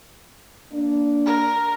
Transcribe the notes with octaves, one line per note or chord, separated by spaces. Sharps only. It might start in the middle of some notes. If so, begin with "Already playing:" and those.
A#3 D4
A#4